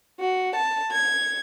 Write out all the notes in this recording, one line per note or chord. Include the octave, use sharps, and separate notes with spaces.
F#4
A5
G#6